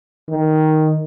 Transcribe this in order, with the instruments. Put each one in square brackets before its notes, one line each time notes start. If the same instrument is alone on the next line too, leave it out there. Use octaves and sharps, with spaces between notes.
[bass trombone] D#3